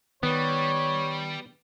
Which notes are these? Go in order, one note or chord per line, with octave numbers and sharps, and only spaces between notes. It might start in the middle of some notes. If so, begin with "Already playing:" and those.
D#3 G3 B3 C#5